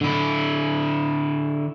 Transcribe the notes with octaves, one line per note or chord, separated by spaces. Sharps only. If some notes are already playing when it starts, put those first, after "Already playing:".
D3 E4